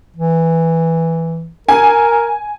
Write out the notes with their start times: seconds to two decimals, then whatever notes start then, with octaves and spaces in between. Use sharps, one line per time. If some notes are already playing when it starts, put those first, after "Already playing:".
0.17 E3
1.69 A#4 G#5